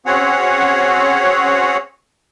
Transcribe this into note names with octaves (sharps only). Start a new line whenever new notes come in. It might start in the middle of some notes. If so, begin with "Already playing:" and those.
C4 C#4 F#4 G#4 C#5 F#5